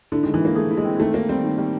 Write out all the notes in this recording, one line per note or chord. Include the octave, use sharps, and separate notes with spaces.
D3 E4
D#3 G#3
E3
G#3 A#3
A3 G#4
E4
G#3
C4
D#3 A3
D#3 A#3
G3 C4
D#3
G3